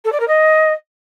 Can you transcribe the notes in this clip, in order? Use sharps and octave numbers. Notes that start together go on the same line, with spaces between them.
A4
D5
A#4
D#5